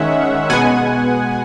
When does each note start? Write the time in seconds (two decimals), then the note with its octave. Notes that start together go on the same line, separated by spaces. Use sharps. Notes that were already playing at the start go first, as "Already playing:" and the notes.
Already playing: D#3 G#3 C#4 E5 F#5
0.50 B2 G#3 B3 F#5 G#5